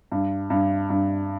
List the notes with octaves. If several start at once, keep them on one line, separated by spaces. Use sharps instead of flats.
G2
G2
G2